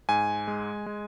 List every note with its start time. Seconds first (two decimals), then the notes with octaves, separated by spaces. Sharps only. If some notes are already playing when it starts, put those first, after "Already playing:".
0.09 G#2 G#5
0.48 G#3
0.86 G#3